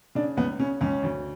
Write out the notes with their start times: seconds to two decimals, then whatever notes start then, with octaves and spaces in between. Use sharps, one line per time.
0.15 C#3 D4
0.37 C#2 B3
0.59 C#3 C#4
0.81 C#2 C#4
1.03 D2